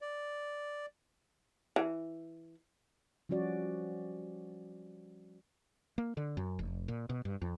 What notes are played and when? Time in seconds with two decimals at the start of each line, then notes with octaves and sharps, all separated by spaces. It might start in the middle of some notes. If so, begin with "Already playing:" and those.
0.01 D5
1.76 E3
3.29 F3 G3 C#4 F#4 D5
5.98 A#3
6.17 D3
6.37 F#2
6.59 F1
6.88 A#2
7.10 B2
7.25 G2
7.42 F2